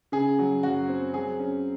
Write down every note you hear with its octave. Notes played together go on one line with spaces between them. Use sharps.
C#3 G#4
F#3
F#2 F#4
C4
F#3 G#4
C#4